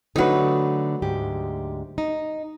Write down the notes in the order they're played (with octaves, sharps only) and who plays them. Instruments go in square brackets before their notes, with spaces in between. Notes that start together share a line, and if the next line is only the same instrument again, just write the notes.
[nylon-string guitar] D3 A3 B4 [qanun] F#3 D#4
[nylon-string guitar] D2 G#2 G4
D#4